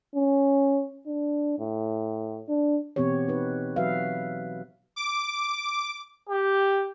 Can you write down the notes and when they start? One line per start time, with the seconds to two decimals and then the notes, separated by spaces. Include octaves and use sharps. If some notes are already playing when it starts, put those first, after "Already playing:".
0.15 C#4
1.07 D4
1.59 A2
2.49 D4
2.96 B2 E3 B3 C4 G4 C#5
3.28 D#4 B4
3.76 E3 F#3 F#4 B4 E5 F5
4.96 D6
6.29 G4